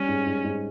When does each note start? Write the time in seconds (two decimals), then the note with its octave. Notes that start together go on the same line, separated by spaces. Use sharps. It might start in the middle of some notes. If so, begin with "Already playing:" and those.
Already playing: G3 C#4
0.09 G#2
0.26 G#2
0.44 G#2